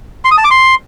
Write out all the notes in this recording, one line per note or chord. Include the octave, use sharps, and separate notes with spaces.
C6
D#6
A5
D6
C6